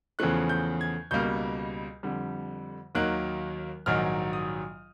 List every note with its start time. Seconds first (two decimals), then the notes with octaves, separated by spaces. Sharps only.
0.19 E2 C#3 F3 A3 F#6
0.49 G6
0.81 G#6
1.11 C#2 B2 G3 A#3 G6
2.03 F2 D3 G3
2.95 D#2 D#3 F#3 A#3 F#6
3.86 A#1 G#2 D#3 F#3 F6
4.33 D#6